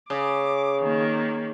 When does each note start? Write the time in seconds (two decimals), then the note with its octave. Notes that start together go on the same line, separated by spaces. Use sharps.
0.10 C#3 D6
0.81 D#3 A#3